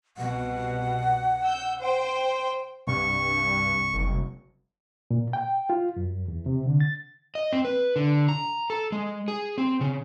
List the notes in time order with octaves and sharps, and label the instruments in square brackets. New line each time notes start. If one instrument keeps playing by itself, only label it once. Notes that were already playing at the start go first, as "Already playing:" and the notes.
[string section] C2 B2 [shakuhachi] F#5
[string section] E6 G6
C5 G5
[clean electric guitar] C2 [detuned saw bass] G2 [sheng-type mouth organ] C#6
[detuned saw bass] F#1
[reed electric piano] A#2
G5
F4
F#2
E2
C3
D3
A6
[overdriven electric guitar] D#5
C4
B4
D3
A#5
A4
G#3
G#4
C4
C#3